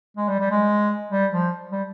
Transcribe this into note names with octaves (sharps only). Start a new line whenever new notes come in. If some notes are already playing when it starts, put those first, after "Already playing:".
G#3
G3
G3
G#3
G3
F3
G3